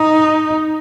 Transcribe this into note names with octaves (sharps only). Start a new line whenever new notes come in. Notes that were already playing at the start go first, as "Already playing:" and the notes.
Already playing: D#4